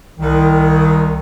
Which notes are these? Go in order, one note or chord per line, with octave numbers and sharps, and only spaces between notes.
C2 D#3